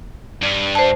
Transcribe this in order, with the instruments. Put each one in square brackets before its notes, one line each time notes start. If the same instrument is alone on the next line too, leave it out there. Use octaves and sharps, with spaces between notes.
[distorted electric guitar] G2
[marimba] C5 A5